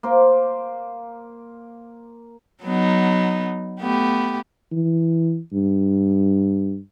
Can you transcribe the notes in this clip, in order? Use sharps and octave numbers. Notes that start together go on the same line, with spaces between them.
A#3 C5
F#3 B3 D#4
A3 B3 G4
E3
G2